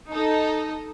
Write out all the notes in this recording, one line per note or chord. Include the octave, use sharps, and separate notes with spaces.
D#4 A4 D#5